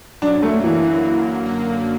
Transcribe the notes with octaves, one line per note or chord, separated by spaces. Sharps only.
F#3 D4
F#2
A3
A#3
E3
D3
A#3
A#3
F#2
F#3
A#3
F#2
A#3